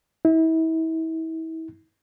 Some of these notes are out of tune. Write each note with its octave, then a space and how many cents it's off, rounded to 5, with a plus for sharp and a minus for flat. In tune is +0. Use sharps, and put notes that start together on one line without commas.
E4 -35